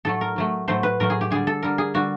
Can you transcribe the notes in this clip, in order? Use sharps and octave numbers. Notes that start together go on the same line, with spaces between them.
A2 F#3 A3 A4
A#4
A2 F#3 A3
A2 F#3 A3 C5
B4
A2 F#3 A3 A#4
G#4
G4
D3 G3 G#4
A4
D3 G3 A#4
G#4
D3 G3 F#4